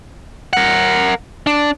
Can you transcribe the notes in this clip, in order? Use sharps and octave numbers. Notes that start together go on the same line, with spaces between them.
A#4 F#5
D4